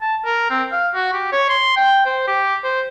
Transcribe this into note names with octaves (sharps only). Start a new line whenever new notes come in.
A5
A#4
C4
F5
F#4
G4
C#5
C6
G5
C5
G4
C5